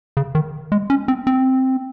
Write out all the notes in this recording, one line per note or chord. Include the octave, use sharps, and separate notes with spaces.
C#3
D#3
G#3
C#4
C4
C4